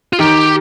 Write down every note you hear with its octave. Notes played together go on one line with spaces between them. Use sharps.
F4
D#3 G4